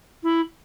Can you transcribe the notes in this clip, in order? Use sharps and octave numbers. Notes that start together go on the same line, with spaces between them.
E4